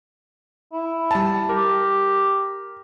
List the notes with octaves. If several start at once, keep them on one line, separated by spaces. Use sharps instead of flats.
E4
G3 A5
G4 A#4